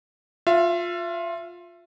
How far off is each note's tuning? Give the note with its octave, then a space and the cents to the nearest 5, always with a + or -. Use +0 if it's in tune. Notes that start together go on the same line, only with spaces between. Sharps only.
F4 +15 E5 +35